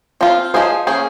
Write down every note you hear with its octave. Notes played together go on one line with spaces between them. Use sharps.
F3 C4 F4
F3 A#3 D#4 G#4 C5
A#3 C#4 G#4 C5